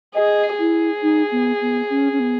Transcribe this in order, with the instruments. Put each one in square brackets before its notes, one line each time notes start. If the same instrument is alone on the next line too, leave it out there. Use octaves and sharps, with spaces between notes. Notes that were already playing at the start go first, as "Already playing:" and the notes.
[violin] G#4 [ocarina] D#5
[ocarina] E4 [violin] G#4
[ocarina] D#4
B3
B3
C#4
C#4
B3